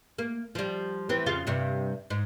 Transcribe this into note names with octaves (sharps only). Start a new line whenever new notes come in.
A#3
F3 G3
E3 B3 C4
F2 C#3 F4
G2 C3
G#2